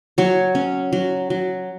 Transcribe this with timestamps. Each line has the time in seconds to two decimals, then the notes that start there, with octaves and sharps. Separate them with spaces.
0.18 F#3 C#5
0.55 C#4
0.93 F#3
1.30 F#3